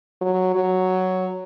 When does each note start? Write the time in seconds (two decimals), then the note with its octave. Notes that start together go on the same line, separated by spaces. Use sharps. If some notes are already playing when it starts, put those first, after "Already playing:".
0.21 F#3
0.56 F#3